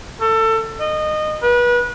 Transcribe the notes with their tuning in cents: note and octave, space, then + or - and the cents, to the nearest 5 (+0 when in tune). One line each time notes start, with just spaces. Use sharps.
A4 +25
D#5 -20
B4 -30